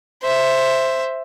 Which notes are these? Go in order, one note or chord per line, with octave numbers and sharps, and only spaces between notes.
C5 E5